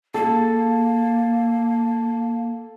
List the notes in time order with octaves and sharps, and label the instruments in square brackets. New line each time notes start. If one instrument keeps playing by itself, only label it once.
[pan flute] A#3 [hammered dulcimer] A4